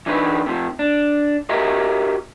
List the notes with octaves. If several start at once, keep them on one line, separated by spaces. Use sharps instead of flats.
E3 D4 D#4 B4
C3 F3
D4
F#4 G4 A#4 D#5 E5